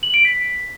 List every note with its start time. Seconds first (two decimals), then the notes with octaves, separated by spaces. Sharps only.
0.03 F#7
0.14 D7
0.25 B6